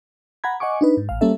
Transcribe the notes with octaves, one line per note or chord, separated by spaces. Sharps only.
F#5 A#5 B5 G#6
D#5 F#5 G#5 C#6 D6
D4 D#4 B4
G#2
A1 F5
G3 A#3 C#4 A4 E5